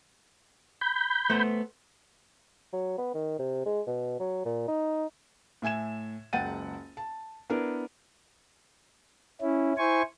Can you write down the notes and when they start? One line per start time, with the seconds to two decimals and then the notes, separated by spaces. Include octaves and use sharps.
0.81 B5 G6
1.30 A3 B3 C5
2.73 F#3
2.98 B3
3.14 D#3
3.39 C3
3.66 G#3
3.87 B2
4.20 F#3
4.45 A#2
4.68 D#4
5.62 A2 E5 G#5 G#6 E7
6.33 F#1 C#2 F#5 G5 A6 D#7
6.97 A5
7.50 B3 D4 E4 A#4
9.41 C#4 E4
9.78 E4 C5 G#5 C#6